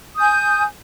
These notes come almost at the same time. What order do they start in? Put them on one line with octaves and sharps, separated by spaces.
D#6 G6 G#5